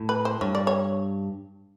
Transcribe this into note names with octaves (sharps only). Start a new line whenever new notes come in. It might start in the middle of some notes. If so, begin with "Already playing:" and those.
Already playing: A2
B4
C5
G2 C#5
D5
C#5